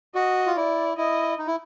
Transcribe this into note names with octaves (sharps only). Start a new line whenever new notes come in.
F#4 D#5
F4
E4 D5
E4 D#5
D#4
E4